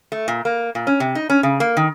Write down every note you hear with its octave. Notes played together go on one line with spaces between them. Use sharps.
A3
A#2
A#3
A#2
C#4
C3
D#4
C#4
C#3
A#3
D#3